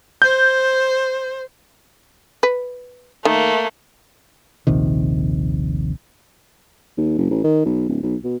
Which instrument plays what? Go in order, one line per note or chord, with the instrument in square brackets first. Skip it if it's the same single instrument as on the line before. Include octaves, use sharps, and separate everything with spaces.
[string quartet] C5 [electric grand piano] G6
[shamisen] B4
[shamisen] D#3 [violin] A3 A#3
[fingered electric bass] D#1 A#1 C3 D#3
[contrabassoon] D#2
F#1
A1
D#3
B1
D1
B1
B2